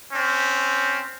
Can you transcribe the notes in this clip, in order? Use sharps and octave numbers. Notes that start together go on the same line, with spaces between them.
C4 C#4